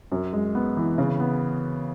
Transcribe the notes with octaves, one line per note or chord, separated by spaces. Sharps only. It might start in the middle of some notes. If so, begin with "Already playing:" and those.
F#2
G#3
B3
E3
C#3
B3